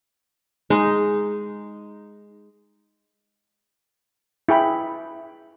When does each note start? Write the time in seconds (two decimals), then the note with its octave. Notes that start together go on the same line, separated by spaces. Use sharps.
0.70 G#3 D#4
4.49 E4 G#4 G5 B5